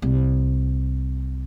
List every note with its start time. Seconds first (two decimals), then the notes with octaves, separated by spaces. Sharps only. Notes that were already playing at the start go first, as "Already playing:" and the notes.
0.02 C2